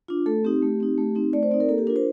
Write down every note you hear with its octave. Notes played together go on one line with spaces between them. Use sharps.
D4 F4
A3 A4
C4 D#4 G4
A3
C4 D#4
A3
C4 D#4
A3 D5
C5
C4 D#4 D5
A#4
A#3 A4
G4
D4 F4 A#4
C5